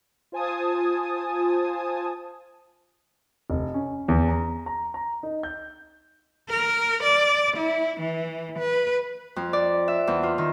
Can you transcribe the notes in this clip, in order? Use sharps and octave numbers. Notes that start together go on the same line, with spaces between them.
F4 C5 G#5 A5 D#6
F1
C#4
E2
A#5
A#5
A#5
D#4
G6
A#4
D5
E4
E3
B4
F2
D5
E5
E2
F4
D#3